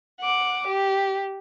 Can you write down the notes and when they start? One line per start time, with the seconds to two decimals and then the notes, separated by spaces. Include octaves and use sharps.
0.19 F#5 D6
0.67 G4